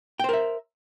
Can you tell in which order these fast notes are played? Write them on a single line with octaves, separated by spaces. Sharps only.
G5 C5 A#4 E5